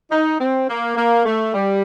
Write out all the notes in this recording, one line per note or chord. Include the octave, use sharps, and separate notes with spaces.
D#4
C4
A#3
A#3
A3
G3